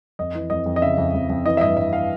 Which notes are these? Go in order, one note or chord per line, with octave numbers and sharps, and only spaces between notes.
F2 D#5
E3
F2 D#5
F2
D#5
C#3 E5
F2
F2
F2
E3 D#5
E5
G2 D#5
G2 E5
F5